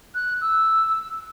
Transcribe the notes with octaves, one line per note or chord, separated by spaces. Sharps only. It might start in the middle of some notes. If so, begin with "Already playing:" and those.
F#6
E6